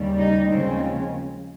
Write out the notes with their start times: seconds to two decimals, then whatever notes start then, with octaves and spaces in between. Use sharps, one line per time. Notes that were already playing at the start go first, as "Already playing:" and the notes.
Already playing: D#2 C#3 G3
0.18 D#4
0.49 D#2 C#3 F3 G#3 C4